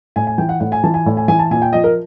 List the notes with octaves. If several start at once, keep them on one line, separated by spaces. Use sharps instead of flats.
A2 G#5
G#5
E3 G5
F#5
A2 F#5
G#5
E3 A5
G#5
A2
G#5
E3 G#5
A5
A#2 G#5
G5
F3 D#5
A#4